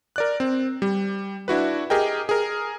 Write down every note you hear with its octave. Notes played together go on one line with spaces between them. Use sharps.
A#4 D5 F#6
C4
G3
D4 E4 F#4 B4
G4 G#4 A#4 D#5 G5
G#4 A#4